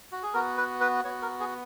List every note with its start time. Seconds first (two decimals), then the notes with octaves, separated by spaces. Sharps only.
0.12 F#4
0.23 G#4
0.34 B3 F#4 A#4
0.57 B4
0.81 B4
1.05 B3 F#4 C#5
1.22 A#4
1.40 G#4